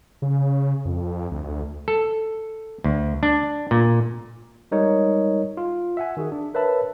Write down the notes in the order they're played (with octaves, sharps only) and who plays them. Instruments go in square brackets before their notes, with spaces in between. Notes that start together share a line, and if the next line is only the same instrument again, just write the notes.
[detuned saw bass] C#3
F2
D2
[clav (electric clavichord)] A4
D2
D4
A#2
[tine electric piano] G3 G#3 D#4 A#4 C#5 D#5
F4
E5 F#5 G#5
D#3 F#4 G#4
D4
A#4 B4 C#5 E5 A5 B5